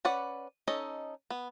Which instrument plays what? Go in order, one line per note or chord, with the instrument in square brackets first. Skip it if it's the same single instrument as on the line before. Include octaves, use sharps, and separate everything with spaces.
[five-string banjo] C#4 B4 D5 F#5
C#4 D#4 A4 D#5
B3